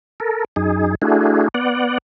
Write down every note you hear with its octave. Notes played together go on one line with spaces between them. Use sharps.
A4 A#4
F#2 D#4 G#4
A3 D4 E4 F#4 G#4
B3 D5 F#5